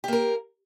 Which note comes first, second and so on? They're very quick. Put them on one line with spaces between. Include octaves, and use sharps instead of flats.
G4 A#3 A#4